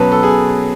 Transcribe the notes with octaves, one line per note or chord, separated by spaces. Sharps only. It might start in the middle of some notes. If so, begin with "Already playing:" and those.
Already playing: B2 F#3 C#4 B4 A5
A4
G#4